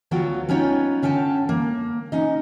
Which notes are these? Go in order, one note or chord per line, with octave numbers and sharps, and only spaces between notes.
D2 F#3 B3 F4 F#4 G5
B3 C#4 D#4 F4 C#5 G5
D3 C#4 F5 G5 A5
A#3
C#4 D#4 D#5